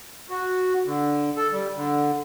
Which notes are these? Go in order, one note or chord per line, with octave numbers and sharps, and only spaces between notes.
F#4
D3
A4
G3
D3